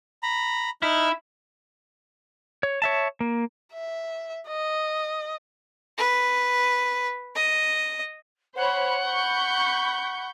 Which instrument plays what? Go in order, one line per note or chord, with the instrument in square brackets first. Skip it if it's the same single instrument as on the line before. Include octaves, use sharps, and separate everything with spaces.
[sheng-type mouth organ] A#5 B5
[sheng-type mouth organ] D#4 F6 [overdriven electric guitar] E4
[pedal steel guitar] C#5
C#5 E5 A5
A#3
[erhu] E5
D#5
[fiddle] B4
D#5
[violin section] C5 C#5 B5 [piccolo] F#5
[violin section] B5 C#6 G6